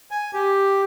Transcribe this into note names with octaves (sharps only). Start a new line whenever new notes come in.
G#5
G4